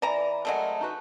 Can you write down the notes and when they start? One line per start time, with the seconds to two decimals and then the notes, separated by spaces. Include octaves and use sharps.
0.02 E3 D5 A#5
0.45 F#3 G#3 A3 A#4 D#5
0.81 D#4 F#4 B4